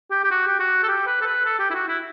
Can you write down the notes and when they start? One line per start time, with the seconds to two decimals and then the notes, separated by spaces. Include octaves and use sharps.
0.11 G4
0.24 G4
0.31 F#4
0.47 G4
0.59 F#4
0.83 A4
0.88 G4
1.07 B4
1.21 A4
1.26 B4
1.45 A4
1.59 G4
1.70 E4
1.74 F#4
1.88 E4